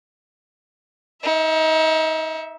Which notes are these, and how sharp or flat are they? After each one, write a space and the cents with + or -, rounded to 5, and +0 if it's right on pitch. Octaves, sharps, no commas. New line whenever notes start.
D#4 +30 E5 +0